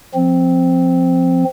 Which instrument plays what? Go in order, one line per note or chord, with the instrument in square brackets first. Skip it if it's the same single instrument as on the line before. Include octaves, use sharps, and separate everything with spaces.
[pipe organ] F3 C4